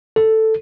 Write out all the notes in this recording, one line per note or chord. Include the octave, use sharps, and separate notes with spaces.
A4